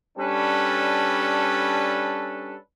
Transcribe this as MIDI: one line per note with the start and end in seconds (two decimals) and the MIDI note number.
0.18 2.55 55
0.18 2.55 61
0.18 2.55 62
0.18 2.55 69
0.18 2.55 71